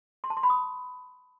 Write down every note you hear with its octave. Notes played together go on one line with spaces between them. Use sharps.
C6
A5
C6
B5
D#6